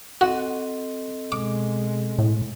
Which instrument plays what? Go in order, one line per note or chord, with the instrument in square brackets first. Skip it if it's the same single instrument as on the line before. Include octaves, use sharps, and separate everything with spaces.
[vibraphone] C4 A4 D#5 [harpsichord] F#4
[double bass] B2 G#3 [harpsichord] D6
[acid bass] A2